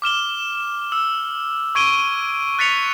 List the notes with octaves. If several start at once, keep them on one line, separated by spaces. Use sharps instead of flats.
D6 F6 E7 G7
E6
C#6 G#6 D7 D#7 G7
F#6 A6 B6 C#7 F7